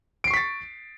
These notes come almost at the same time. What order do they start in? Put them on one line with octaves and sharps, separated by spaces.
D7 C7 C#6 B6 A6